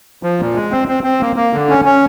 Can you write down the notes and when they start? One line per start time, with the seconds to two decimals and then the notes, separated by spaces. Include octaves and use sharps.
0.23 F3
0.40 A#2
0.55 G#3
0.71 C4
0.88 C4
1.04 C4
1.21 A#3
1.36 A#3
1.53 D3
1.69 C#4
1.85 C#4